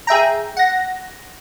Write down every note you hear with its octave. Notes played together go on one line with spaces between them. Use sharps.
G#4 E5 G5 A#5
F#5 A#6